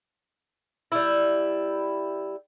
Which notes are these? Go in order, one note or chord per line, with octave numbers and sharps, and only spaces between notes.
G3 E4